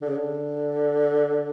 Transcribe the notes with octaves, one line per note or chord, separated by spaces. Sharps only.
D3
C#3
D3